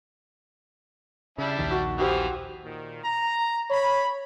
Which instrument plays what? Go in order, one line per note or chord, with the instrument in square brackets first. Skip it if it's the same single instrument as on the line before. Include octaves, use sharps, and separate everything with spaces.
[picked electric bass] C#3 [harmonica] G3 D4 E4
[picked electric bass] A#1 D#2 D#3
[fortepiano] F#4
[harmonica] E3 F3 [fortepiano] F#4 G4 C5
[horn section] A#2 D#3
A#5
[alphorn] C#5 [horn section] B5